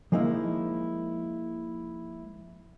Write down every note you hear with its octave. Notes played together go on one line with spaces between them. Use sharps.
F3 G#3 A#3 D#4 E4